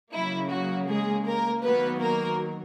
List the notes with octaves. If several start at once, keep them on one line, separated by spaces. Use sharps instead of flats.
C#3 F#3 A#3 E4
F#3 F#4
G#3 G#4
A#3 A#4
D#3 F#3 A#3 B3 B4
A#3 A#4